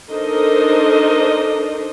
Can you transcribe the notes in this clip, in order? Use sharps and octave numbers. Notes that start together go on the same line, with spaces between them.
D4 D#4 A4 A#4 C5 D#5